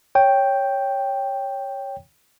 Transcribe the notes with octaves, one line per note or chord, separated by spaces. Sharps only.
C#5 G5